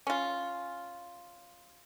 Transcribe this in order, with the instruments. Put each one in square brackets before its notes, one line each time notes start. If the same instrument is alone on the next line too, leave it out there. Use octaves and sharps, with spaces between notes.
[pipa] C#4 F4